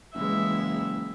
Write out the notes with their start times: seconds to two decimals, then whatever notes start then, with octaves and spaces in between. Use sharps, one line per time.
0.14 F#1 E3 G#3 E5